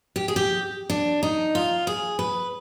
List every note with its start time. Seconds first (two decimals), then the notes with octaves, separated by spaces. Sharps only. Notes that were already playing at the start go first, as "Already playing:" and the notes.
0.16 G4
0.28 G#4
0.36 G4
0.90 D4
1.23 D#4
1.55 F4
1.87 G#4
2.19 B4